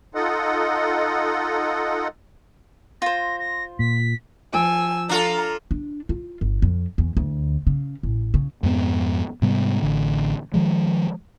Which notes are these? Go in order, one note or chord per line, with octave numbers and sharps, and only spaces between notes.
D#4 F4 A4 D#5 F#5
F4 C5 A#6
A#6
A#2 B6
F3 G#5 E6 D7
D4 F4 A4 A#5
D4
F4
G1
F2
E2
D2
C#3
A1
C#3
F2 G#2 B3
G#2 C3 G3 B3
A1 D3
D#3 F3 G#3